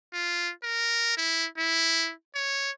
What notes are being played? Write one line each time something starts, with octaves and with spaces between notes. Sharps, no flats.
F4
A#4
E4
E4
C#5